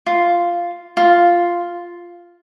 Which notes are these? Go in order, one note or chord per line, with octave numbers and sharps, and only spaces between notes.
F4
F4